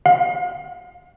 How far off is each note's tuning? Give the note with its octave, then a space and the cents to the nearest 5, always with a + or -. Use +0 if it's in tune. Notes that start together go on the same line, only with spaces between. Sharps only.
F5 +45